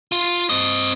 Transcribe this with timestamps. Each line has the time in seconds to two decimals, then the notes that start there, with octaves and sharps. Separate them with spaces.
0.12 F4
0.49 C4 D#5